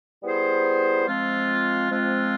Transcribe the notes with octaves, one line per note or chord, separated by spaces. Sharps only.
G3 B3 E4 G#4 C5
F3 G#3 C4 F4
F3 G#3 C4 F4